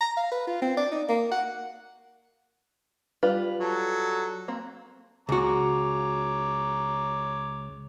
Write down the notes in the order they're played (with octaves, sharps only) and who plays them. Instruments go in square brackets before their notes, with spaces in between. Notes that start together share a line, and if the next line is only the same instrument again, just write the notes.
[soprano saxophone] A#5
F5
B4
F4
C4
D5
D#4
A#3
F#5
[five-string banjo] G3 F4 B4
[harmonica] F#3 A4
[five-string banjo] A#3 C4
[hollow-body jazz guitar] C#2 F#4 [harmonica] C#5 A#5 D6